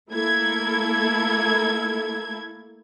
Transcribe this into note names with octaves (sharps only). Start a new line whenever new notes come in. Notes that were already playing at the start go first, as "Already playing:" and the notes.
A3 A#3 E4 A4 G#6